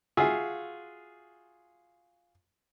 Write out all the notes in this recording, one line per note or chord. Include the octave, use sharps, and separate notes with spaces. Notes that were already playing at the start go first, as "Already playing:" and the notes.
F4 F#4 G#4 E5 F5